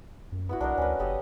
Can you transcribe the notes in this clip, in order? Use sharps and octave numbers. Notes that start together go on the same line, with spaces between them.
F#2
B3 E4 F#4
B1 D4 A#4 D#5
D2 C#4 B4
F#1 G4 A4 D#5